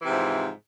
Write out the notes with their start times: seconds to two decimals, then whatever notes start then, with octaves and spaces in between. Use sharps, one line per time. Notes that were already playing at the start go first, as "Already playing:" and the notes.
0.02 E3
0.05 C3
0.08 G#2
0.11 F3